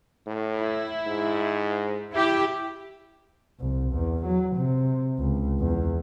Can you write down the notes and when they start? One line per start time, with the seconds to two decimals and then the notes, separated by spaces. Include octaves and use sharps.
0.26 A2
0.58 E4
1.07 G#2
2.12 E4 G4
3.60 C2
3.93 E2
4.25 F#3
4.56 C3
5.19 C#2
5.60 E2